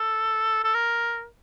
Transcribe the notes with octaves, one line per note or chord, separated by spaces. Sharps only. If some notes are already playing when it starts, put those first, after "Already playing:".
Already playing: A4
A4
A#4